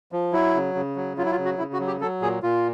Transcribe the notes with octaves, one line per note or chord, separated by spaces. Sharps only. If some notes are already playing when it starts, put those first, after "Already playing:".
F3
F#3 E4
C#3
C#3
F#3
F#3 F4
E4
F4
C#3
F#4
C#3 E4
F#4
F#3
G4
F#3 A4
A#2 G#4
A#2 F4